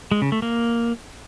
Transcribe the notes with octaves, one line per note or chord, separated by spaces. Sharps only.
G#3
C#3
A3
A#3